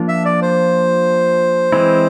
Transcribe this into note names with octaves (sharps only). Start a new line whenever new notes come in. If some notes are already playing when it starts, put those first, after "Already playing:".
Already playing: F3 A#3 D4 F4
E5
D5
C5
E3 G#3 C4 E4